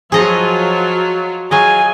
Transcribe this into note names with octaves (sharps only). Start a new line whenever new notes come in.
F3 F#3 F4 G#4 D#5 A#5
F#3 F4 G#4 D#5 G#5